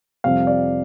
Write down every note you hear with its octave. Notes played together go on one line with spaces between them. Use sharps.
F2 C3 G3 F5
D5